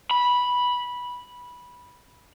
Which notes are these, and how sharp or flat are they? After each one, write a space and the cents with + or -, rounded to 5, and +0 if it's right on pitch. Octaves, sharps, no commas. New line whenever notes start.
B5 -10